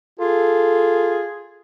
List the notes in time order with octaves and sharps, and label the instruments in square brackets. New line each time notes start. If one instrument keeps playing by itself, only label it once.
[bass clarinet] F4 [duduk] G#4 [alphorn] A4